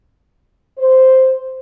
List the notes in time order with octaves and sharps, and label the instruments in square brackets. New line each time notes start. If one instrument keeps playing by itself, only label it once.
[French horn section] C5